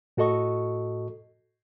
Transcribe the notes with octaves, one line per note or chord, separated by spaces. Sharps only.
A2 F#4 A4 D#5 C#6